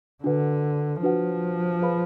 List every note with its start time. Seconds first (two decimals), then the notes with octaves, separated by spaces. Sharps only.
0.23 D3 D4 F#4 B4 F#5
1.02 F3 D4 F#4 B4 F#5
1.81 G#4 B4 F5 B5